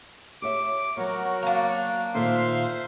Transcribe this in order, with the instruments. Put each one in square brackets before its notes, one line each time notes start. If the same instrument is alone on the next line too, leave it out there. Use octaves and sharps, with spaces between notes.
[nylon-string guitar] G4 C#5 E5 [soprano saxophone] D6
[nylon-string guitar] F#3 B3 [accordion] F#4 A#4 [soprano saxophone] C#5
[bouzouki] A#3 D4
[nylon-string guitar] A#2 D#3 A4 [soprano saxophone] C5 [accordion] E5 F5 C6